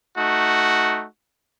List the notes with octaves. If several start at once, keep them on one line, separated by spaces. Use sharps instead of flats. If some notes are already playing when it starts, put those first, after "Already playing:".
A3 D#4 F#4